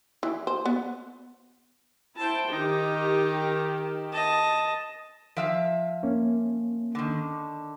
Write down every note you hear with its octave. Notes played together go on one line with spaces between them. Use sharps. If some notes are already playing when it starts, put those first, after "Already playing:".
E3
C5
B3
E4 C5 G5 A5
D#3 D#4 G4
D#5 A5
F3 E5 F5
A#3 C#4
D3 D#3